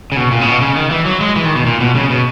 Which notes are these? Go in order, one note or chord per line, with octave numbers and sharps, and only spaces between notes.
C#3
B2
A#2
C#3
B2
C#3
D#3
E3
F#3
G#3
E3
D#3
B2
A#2
B2
C#3
B2